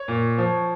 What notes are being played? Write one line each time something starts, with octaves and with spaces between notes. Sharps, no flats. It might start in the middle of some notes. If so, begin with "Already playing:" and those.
Already playing: C#5
A#2
F3